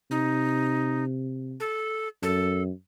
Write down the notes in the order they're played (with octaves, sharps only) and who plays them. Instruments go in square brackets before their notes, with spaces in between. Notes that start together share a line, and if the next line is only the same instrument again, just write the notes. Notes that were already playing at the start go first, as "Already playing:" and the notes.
[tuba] C3 [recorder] D#4
[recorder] A4
[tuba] F#2 [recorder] A4